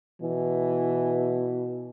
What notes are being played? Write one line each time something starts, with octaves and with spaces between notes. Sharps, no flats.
B2 E3